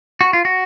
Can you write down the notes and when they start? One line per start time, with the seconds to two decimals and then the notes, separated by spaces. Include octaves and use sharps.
0.21 F#4
0.33 F4
0.45 F#4